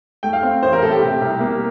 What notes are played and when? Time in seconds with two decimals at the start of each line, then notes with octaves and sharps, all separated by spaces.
0.23 A3 G5
0.33 F5
0.43 C4
0.62 A1 C5
0.73 A#4
0.82 A2 A4
0.92 G4
1.01 C3
1.21 C2
1.40 A#3